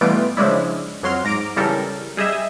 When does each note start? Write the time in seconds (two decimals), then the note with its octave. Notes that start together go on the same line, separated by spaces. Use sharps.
0.01 B2 E3 G3 A3 F4 D7
0.37 C#3 F3 G#3 D4 E4
1.03 F2 F#3 C6 F6
1.24 G#2 A#5 D6 D7
1.56 C#3 E3 G3 A4 A#4
2.17 G3 G#4 D#5 E5